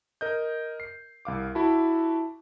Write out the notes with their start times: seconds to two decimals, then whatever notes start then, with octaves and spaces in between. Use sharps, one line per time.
0.21 A#4 D#5 G6
0.80 C7
1.25 C2 F5 D6
1.55 E4 F#4 A5 B5